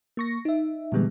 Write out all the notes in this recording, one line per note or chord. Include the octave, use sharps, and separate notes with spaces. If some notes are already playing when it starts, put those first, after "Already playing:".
A#3 C#6 A#6
D#4 E5
A#2 D3 E3 G3 G#3 B3